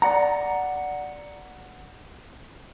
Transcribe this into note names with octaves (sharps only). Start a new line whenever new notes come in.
D5 F#5 A#5